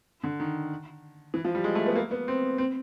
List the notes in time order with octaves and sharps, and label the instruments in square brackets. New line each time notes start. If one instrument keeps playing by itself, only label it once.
[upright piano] D3
D#3
E3
F3
G3
G#3
A3
B3
A#3
B3
C4
C4